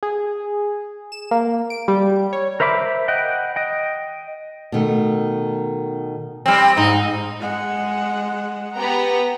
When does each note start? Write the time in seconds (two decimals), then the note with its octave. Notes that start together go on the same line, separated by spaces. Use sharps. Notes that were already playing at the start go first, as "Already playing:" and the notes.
0.03 G#4
1.12 E7
1.31 A#3
1.70 D7
1.88 G3
2.33 C#5
2.60 A#4 C5 E5 B5 D6
3.08 D#5 F#5 G5
3.56 D#5 G5
4.72 B2 D#3 A3
6.46 G3 C4
6.77 G#2 D#4
7.40 G#3 F#5
8.76 B3 G4 A#5